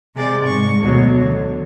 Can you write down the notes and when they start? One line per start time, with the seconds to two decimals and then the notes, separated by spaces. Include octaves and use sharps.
0.15 C3 G#3 D5
0.45 G#2 C#6
0.78 D2 B2 F#3
1.22 D3